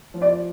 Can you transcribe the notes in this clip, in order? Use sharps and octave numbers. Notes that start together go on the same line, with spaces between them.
F3
D5